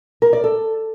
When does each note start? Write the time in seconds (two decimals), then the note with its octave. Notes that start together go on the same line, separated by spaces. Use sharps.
0.22 A#4
0.33 D5
0.44 A4